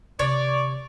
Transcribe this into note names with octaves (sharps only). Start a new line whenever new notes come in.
C3 D#3 C#5 D5